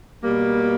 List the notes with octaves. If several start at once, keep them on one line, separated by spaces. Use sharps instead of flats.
B2 G3 A#3